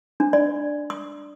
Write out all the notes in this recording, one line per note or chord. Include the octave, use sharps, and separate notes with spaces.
D4
D5
D#6